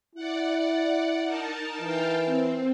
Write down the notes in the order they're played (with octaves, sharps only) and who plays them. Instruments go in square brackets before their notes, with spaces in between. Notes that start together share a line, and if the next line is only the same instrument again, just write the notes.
[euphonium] E4 [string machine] D5 F#5
[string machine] D#4 A#4 A5
[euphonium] E3 [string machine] F5 G5 A5
[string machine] C4